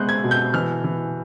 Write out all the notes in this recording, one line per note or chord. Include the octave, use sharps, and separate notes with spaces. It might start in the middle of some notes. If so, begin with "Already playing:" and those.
Already playing: G#3 B3 F#6 G6
G#6
B2
G6
E3 F6
E3